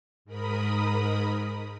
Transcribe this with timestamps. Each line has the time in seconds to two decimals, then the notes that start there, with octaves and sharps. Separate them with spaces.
0.25 G#2 A#4 B5 D#6